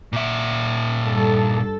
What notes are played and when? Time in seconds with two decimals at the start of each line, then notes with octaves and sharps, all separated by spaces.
0.13 A#2 E5
1.05 G2 A4